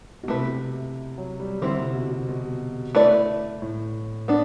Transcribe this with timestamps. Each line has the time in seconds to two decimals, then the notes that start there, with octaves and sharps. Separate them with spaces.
0.23 B2
0.28 C3 A3 E4 B4
1.18 F#3
1.40 G3
1.62 D3 G3 C4 E4
1.79 C3
1.95 B2
2.11 B2
2.28 B2
2.95 A3 E4 B4 D5
3.62 A2
4.28 B3 D4